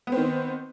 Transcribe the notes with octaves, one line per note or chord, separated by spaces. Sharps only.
D#3 B3 C4